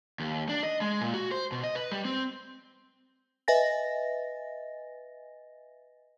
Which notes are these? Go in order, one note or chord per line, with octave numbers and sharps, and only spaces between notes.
D#2
D4
D#5
G#3
A#2
F#4
C5
B2
D#5
B4
G3
C4
B4 D#5 E5 G#5 A6 A#6